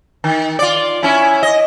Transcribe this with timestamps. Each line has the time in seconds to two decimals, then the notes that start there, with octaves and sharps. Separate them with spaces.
0.24 D#3
0.59 F4 D5
1.03 C#4 E4
1.43 D#5